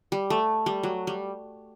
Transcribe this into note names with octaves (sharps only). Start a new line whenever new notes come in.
G3
A3
G3
F#3
G3